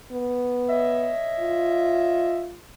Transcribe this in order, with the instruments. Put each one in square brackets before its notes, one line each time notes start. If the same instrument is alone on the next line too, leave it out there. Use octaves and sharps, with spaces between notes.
[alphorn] B3
[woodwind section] C#5 D#5 E5
[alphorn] F4